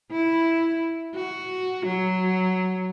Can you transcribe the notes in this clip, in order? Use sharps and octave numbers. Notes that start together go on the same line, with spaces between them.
E4
F#4
F#3